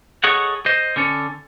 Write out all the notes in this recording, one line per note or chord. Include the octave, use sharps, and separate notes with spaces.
G#4 A4 C#5 D#5 F#5
C5 D#5
D3 C#4 A4